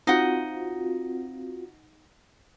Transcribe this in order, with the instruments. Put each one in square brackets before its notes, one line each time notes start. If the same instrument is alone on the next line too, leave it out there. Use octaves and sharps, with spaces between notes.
[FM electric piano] C4 F4 F#4 [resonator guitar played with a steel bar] D#4 F#5